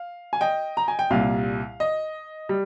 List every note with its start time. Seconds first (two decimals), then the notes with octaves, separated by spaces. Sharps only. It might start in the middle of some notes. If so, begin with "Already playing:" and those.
Already playing: F5
0.33 G#5
0.41 D#5 G5
0.77 A#5
0.88 G#5
0.99 G5
1.10 C2 A#2 G3 F5
1.80 D#5
2.49 G3